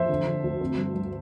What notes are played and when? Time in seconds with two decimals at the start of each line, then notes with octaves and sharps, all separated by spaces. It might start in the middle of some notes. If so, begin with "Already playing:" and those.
Already playing: F2 C5 E5
0.09 D3
0.27 D3
0.44 D2
0.61 C4
0.77 G2
0.95 G2